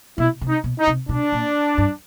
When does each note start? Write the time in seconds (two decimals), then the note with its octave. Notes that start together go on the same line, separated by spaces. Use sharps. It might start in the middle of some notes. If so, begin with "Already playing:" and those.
0.18 B2 E4
0.41 C3
0.48 D#4
0.64 B2
0.79 D#4
0.87 C3
1.09 B2 D4
1.32 A#2
1.78 G2